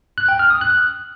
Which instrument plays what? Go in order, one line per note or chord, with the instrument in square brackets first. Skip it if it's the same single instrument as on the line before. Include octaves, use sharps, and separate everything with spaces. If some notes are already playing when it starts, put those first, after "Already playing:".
[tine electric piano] F#6
G5
F6
D#6
F#6